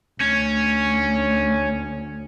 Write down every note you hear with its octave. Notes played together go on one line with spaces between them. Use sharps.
D2 C#4